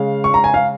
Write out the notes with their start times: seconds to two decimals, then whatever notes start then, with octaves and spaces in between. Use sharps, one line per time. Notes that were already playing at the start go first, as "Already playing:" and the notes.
Already playing: C#3 G#3 F5
0.24 C#6
0.34 A#5
0.44 G#5
0.54 F5